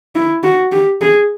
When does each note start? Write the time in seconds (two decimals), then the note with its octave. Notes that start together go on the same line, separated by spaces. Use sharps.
0.15 E4
0.43 F#4
0.72 G4
1.01 G#4